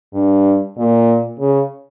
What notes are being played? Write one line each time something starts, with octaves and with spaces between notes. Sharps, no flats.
G2
A#2
C#3